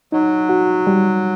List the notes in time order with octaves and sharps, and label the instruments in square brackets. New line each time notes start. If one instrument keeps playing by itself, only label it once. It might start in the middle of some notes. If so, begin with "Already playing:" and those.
[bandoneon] F#3 [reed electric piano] D#4
[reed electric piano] F#4
G3